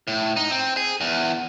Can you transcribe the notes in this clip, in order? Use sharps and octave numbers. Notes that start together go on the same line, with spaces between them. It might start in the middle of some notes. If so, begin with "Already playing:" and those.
A2
D#4
C4
G#4
E2